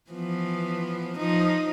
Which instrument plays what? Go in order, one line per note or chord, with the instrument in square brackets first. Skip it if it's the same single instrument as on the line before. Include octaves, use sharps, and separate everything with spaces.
[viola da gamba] E3 F3 B3
F3 D#4